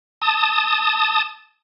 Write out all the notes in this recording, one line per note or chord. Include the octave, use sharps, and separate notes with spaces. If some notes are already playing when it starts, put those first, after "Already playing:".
A5 D#6